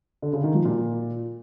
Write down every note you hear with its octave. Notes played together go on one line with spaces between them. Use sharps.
D3
C#3
D#3
F3
A#2